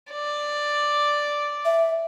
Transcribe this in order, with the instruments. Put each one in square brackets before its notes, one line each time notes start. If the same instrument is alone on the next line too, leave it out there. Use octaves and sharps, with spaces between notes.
[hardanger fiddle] D5
[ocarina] E5